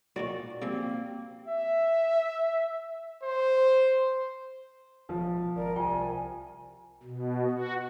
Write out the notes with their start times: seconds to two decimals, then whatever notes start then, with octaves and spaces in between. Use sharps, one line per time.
0.16 A#2 D#3 F#3 F#4 D5
0.62 C#3 F3 G3 A#3 C4
1.48 E5
3.23 C5
5.09 E1 F3
5.56 G#1 A#4 D5
5.76 C2 F4 G5 G#5
7.03 B2
7.50 F#4